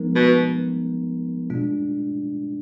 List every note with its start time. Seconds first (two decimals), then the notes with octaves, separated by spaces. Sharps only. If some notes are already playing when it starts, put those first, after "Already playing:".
Already playing: F3 G#3 B3 D#4 A#4
0.15 B2
1.50 B2 G#3 D4 F4